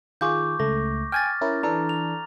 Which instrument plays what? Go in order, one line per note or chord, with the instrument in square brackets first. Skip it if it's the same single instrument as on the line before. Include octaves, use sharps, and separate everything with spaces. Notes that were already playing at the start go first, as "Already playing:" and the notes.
[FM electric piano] D#3 F4 G#4 [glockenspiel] C#6 D6 G6
[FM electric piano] C#2 A3 [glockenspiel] A#6
[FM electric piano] G5 G#5 [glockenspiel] F6 A6
[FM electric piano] C#4 E4 A#4
[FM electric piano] E3 D4 A4 [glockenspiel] A#5
[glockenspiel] F7